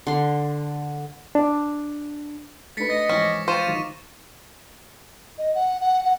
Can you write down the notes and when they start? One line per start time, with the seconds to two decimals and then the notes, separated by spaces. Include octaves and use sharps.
0.07 D3 C6
1.35 D4
2.77 A3 D4 B4 A6 B6 C#7
2.90 D#5 A#6
3.09 G#2 E3 F3 C#4
3.22 D6
3.48 F4 C5 C#6 D#7 E7
3.67 D#3 F#3 D#4
5.38 D#5
5.55 F#5
5.81 F#5
6.05 F#5